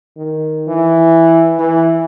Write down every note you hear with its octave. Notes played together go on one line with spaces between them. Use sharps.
D#3
E3
E3